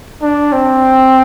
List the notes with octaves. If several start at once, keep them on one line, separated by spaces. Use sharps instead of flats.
D4
C4